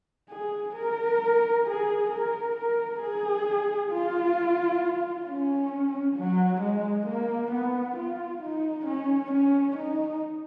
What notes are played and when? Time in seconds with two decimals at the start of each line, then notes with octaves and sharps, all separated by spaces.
0.30 G#4
0.75 A#4
1.65 G#4
2.10 A#4
2.56 A#4
3.01 G#4
3.91 F4
5.26 C#4
6.16 F#3
6.61 G#3
7.06 A#3
7.51 B3
7.96 F4
8.41 D#4
8.86 C#4
9.31 C#4
9.76 D#4